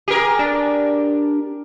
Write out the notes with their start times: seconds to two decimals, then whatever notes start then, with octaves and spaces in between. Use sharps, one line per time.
0.08 G4 G#4 A#4
0.39 D4